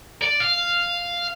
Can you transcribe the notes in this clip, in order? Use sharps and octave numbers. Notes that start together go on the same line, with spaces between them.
D5
F5